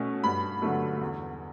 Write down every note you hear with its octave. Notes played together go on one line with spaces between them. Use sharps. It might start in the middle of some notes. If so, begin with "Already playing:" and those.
Already playing: B2 A3 C#4
G2 B5
D3 F#3 A3
E2